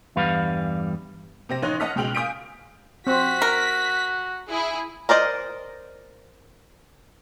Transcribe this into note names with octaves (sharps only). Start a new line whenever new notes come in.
E2 G2 G3 B4 F5
C3 C4 A#6
A1 D#4 C#5 C6 F#6
D#5 F#5 A5 D#6 F6 B6
C#2 B2 G#3 G5 F6 F#7
F5 G#5 D#6 G6 B6 D7
C4 F#4 B6
A#4
E4 G#4
A#4 C5 D5 D#5